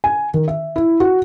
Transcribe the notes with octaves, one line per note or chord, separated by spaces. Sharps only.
G#5
D#3
E5
E4
F#4